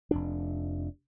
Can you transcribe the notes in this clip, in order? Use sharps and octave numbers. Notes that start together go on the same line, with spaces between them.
F1 F2 D4